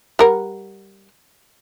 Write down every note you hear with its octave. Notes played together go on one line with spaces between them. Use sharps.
G3 A#4 F#5